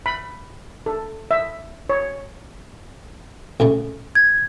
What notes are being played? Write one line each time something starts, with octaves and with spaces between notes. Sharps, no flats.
B5
A4
E5
C#5
A#1 C#3 A3
G#6